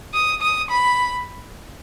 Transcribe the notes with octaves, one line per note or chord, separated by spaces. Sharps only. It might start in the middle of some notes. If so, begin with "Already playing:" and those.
D#6
D#6
B5